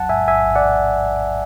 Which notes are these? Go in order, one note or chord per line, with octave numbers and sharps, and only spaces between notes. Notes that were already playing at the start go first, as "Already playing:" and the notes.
Already playing: A1 E2 F#3 F#5 A5
G#2 E5 G#5
A1 E5 G#5
A1
D5 F#5